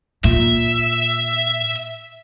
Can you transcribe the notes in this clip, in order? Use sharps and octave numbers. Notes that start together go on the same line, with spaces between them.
A#2 E5